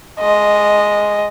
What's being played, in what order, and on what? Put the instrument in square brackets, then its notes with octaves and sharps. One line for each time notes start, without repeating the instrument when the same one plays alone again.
[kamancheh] G#3 D#5